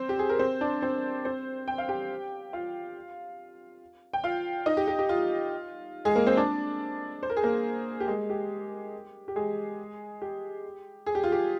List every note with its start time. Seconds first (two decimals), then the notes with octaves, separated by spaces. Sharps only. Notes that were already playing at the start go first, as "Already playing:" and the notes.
Already playing: C4 C5
0.09 G4
0.19 G#4
0.29 A#4
0.39 C4 C5
0.61 D4 D5
0.82 C4 C5
1.25 C4 C5
1.68 G5
1.78 F5
1.89 G4 G5
2.53 F4 F5
4.13 G5
4.23 F4 F5
4.66 D#4 D#5
4.77 G4
4.88 G4
4.99 G4
5.09 F4
6.05 G#3 G#4
6.16 A#3 A#4
6.26 C4 C5
6.37 D4 D5
7.23 C5
7.30 A#4
7.37 G#4
7.43 A#3 A#4
8.00 G4
8.08 G#3 G#4
8.30 G4
9.28 G4
9.36 G#3 G#4
10.22 G4
11.06 G#4
11.15 G4
11.24 F4
11.32 G4